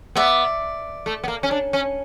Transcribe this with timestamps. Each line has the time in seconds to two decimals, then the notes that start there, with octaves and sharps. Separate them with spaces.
0.16 B3 D5 E5
1.06 A3
1.24 B3
1.28 A#3
1.43 C#4
1.51 D4
1.73 C#4